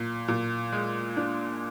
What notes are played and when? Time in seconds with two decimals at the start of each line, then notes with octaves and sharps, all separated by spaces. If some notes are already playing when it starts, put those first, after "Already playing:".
Already playing: A#2
0.28 A#2
0.73 G#3
1.17 D4